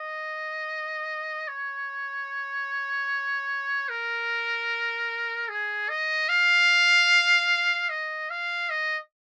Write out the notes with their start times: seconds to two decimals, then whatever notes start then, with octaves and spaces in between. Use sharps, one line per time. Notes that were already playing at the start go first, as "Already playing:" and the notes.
Already playing: D#5
1.48 C#5
3.89 A#4
5.49 G#4
5.89 D#5
6.29 F5
7.90 D#5
8.30 F5
8.70 D#5